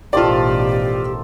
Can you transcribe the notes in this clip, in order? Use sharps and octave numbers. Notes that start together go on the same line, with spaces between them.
A1 B2 D#3 F3 F4 G4 A4 D5